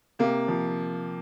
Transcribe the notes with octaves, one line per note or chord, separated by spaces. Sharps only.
C3 A#3
F3